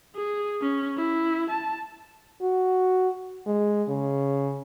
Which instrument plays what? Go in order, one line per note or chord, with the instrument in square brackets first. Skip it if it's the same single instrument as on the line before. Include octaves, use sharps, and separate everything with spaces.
[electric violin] G#4
C#4
E4
A5
[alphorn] F#4
G#3
C#3